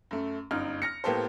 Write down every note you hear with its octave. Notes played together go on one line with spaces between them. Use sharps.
F#2 A3
G1 F#2 D#4 F6
F6 A#6 C#7
A2 A#3 B3 G4 A4 C5